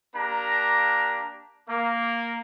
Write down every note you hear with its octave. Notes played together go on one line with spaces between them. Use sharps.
A#3 D4 G4 A#5
A#3